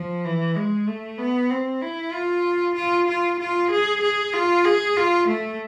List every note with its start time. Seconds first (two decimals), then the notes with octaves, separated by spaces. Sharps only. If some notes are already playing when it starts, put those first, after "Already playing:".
Already playing: F3
0.24 E3
0.56 G#3
0.87 A3
1.18 B3
1.50 C4
1.81 E4
2.13 F4
2.75 F4
3.08 F4
3.39 F4
3.71 G#4
4.01 G#4
4.33 F4
4.65 G#4
4.97 F4
5.28 A3